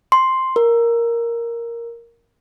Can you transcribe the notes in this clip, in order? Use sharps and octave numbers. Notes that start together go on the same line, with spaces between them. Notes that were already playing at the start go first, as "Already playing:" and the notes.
C6
A#4